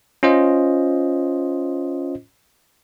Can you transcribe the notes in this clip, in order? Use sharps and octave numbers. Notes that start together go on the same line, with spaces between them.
C#4 F4 C5 D#5